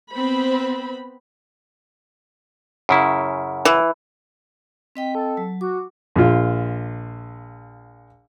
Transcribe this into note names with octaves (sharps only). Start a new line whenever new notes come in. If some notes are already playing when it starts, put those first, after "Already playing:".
B3 C4 C5 B5
F#2 C#3 E4
E3
C4 D#5 G5 B6
A4
F#3
F#4 D6
A#1 F4